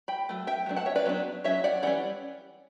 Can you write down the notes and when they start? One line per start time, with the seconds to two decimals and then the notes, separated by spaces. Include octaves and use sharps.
0.08 G5 B5
0.29 F#3 A3
0.47 E5 G5
0.66 F#3 A3 D4
0.76 F#5 A5
0.86 C#5 E5
0.96 B4 D5
1.06 F#3 B3 D4
1.44 F#3 C#4 C#5 E5
1.64 D5 F#5
1.83 E3 G3 C#4 D5 F#5